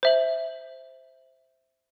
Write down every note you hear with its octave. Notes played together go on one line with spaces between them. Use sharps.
C5 E5 F#7